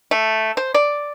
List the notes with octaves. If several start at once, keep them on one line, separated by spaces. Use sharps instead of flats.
A3
C5
D5